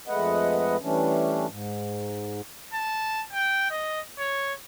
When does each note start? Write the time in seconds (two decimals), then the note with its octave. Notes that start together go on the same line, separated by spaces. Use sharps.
0.08 F2 G#3 A3 B4 D#5 F#5
0.82 E3 G3 A3 C#4 D4
1.48 G#2
2.73 A5
3.33 G5
3.70 D#5
4.18 C#5